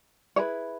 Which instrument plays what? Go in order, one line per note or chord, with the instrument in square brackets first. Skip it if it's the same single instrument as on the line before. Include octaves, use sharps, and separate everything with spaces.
[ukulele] E4 G#4 B4 C#5